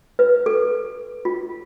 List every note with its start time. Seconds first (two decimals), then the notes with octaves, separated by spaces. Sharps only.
0.19 B4
0.46 A4
1.25 F4